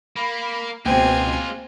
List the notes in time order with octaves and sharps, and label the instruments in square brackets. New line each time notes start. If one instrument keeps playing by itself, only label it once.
[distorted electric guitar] A#3 [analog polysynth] B5
[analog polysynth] C#2 B2 [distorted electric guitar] G#3 F4 [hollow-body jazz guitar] A#3 G5 [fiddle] C4 G#5